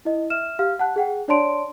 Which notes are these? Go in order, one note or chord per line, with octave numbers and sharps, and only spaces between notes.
E4 D#5
E5 F6 E7
G4 F5 F6
F#5 A5 F#6
G#4 F#5 G5
D4 C#5 D5 A5 C6 D7